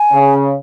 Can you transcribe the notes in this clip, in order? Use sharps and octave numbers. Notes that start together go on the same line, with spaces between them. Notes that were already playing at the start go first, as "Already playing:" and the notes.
Already playing: G#5
C#3